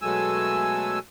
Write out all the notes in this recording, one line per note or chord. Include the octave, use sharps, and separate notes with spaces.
B2 F#3 G#3 A3 G#5 E6